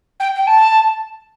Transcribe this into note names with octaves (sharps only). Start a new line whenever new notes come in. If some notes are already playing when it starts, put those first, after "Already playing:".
G5
G5
A5